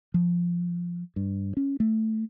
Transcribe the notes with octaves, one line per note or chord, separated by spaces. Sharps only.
F3
G2
C#4
A3